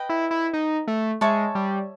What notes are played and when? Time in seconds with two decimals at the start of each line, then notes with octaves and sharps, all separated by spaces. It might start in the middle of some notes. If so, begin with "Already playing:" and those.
Already playing: B4 D#5 G5
0.09 E4
0.31 E4
0.53 D#4
0.88 A3
1.21 G#3 C#5 E5 A5 C#6
1.55 G3